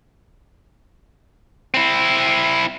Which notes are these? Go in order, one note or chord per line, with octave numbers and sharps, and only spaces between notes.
C4 E4